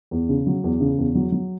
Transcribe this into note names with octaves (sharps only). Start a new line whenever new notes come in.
E2
C#3
F#3
E2
C#3
E2
F#3
F#3